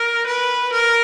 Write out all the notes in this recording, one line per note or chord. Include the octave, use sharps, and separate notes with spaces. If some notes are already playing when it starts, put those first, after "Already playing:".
Already playing: A#4
B4
A#4